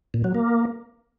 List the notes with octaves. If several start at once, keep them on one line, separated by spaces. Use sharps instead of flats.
A#2
F#3
A#3